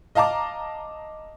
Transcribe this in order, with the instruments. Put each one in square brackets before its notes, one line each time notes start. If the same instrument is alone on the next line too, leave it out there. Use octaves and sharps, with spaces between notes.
[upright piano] D#5 F5 A5 A#5 D6